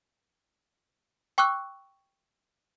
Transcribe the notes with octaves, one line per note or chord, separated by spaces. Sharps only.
G5 C#6 D6 E6 F#6